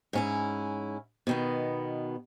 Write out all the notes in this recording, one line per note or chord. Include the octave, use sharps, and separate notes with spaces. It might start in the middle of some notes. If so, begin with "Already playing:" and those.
G#2 C#4 E4
B2 D#3 B3